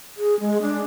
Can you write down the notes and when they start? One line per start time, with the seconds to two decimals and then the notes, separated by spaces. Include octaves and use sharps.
0.17 G#4
0.40 G#3
0.62 D4